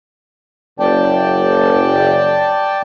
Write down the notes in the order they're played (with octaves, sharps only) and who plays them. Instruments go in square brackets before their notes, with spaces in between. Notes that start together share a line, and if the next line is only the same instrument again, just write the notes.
[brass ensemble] F#1 [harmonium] D5 G5 A5